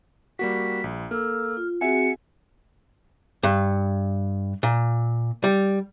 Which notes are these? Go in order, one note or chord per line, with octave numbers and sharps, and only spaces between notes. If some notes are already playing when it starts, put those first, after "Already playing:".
G3 A#3 F#4 B6
A#1
A#3 A4 E6 F6
F4
C4 F#4 G#4 E5 F#5 G#5 C#7
G2
A#2
G3